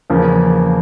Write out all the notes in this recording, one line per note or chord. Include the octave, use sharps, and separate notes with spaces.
E2 C#3 F3 A#3